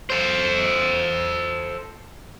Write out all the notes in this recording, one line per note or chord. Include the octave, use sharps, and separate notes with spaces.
A4 C5